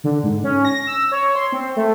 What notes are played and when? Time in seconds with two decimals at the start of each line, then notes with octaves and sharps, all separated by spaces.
0.04 D3
0.23 G#2
0.44 C#4
0.65 A#6
0.87 E6
1.12 C#5
1.35 C6
1.52 C4
1.76 A3